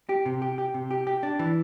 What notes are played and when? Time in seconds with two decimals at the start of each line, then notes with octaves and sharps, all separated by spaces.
0.09 G4
0.26 C3
0.42 G4
0.58 G4
0.74 C3
0.91 G4
1.07 G4
1.23 D4
1.39 E3